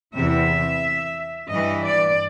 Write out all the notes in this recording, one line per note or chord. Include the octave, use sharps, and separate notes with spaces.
E2 C3 E3 E5
G2 E3 D#5
D5